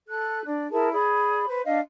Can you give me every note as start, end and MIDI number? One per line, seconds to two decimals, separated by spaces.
0.08 0.42 69
0.08 0.42 90
0.45 0.69 62
0.71 0.91 64
0.71 0.91 68
0.71 0.91 70
0.71 0.91 81
0.92 1.46 68
0.92 1.46 74
0.92 1.46 83
1.46 1.61 71
1.46 1.61 72
1.64 1.79 62
1.64 1.79 75
1.64 1.79 77